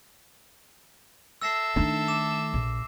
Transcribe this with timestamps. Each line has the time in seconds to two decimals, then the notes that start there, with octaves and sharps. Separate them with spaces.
1.42 A4 E5 E6 A#6 C7
1.76 D#3 A3 D4 D#4
2.08 D6 E7
2.54 A#1